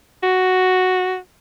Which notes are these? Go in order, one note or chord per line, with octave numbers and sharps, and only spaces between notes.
F#4